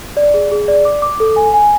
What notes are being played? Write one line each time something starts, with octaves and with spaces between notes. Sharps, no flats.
D5
G#4
G#4
D5
D6
D6
A4
G#5
G#5